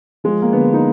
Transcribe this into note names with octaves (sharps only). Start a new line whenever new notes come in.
F3 G#3
A#3
D3 B3
D#4